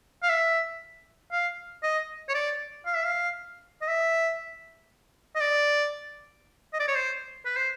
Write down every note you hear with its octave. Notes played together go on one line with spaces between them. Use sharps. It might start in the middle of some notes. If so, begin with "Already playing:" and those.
F5
E5
F5
D#5
C#5
D5
F5
E5
F5
D#5
E5
D#5
D5
D#5
D5
C#5
C5
B4
C5